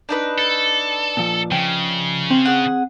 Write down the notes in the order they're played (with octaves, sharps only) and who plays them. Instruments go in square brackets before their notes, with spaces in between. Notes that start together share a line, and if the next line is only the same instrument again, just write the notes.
[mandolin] D4 D#4 B4
[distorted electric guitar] A4
[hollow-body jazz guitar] A#2 F3
[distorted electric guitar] C#3 [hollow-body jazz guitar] F3 G5
[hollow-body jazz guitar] C4
[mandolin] G#4 F#5